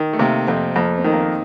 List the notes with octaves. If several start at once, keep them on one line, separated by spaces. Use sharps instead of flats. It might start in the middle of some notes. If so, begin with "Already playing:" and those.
Already playing: D#3
A3
C3 A#3
F2 C4
F2 A#3
C4
D#3
A#3
C4